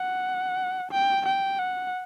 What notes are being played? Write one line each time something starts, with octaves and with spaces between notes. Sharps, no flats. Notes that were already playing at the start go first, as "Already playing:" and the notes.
Already playing: F#5
G5
G5
F#5